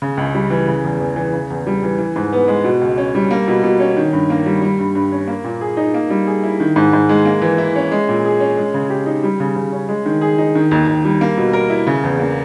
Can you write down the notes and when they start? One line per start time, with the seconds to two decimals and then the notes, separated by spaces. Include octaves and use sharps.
0.02 C#3
0.17 C#2
0.35 G3
0.50 E3
0.68 C#3
0.84 E2
1.00 E2
1.16 E3
1.33 C#3
1.50 E2
1.67 G3
1.83 E3
1.99 E3
2.16 G#2
2.33 B3
2.48 G#3
2.64 B2
2.81 C#2
2.98 C#4
3.15 G3
3.31 A#3
3.48 B2
3.64 B2
3.80 C#4
3.97 D#3
4.13 G2
4.30 A#3
4.46 G3
4.62 G3
4.79 G2
4.95 G2
5.12 C#4
5.28 A#3
5.44 A#2
5.61 G#4
5.77 D#4
5.94 A#3
6.10 G3
6.27 G#4
6.44 E4
6.60 D#3
6.76 G#2
6.93 G#2
7.09 G#3
7.25 A#3
7.42 E3
7.58 E4
7.76 C#4
7.92 G#3
8.09 A#2
8.25 G#4
8.40 C#4
8.57 G#3
8.74 C#3
8.90 G4
9.06 D#4
9.23 G3
9.40 C#3
9.56 C#3
9.72 C#4
9.89 G#3
10.06 D#3
10.21 G#4
10.38 D#4
10.55 D#3
10.71 D#2
10.87 D#2
11.05 G3
11.21 A#3
11.38 B2
11.53 A#4
11.70 E4
11.87 C#3
12.04 E2
12.20 A#3